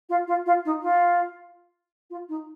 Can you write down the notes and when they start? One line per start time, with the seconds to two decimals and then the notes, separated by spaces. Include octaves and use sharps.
0.09 F4
0.27 F4
0.46 F4
0.65 D#4
0.82 F4
2.10 F4
2.29 D#4